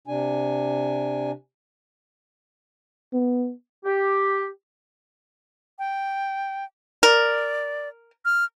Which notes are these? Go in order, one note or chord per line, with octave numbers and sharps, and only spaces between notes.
C3 D4 G#5
B3
G4
G5
A#4 D5
F6